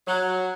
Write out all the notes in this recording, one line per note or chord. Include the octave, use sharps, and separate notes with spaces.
F#3